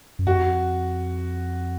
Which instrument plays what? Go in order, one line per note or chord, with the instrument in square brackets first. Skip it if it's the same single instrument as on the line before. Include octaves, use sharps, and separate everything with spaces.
[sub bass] F#2
[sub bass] F2 [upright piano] F#4